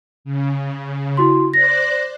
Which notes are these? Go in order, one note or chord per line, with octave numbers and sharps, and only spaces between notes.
C#3
E4 F#4 C6
C5 D5 F#6 A#6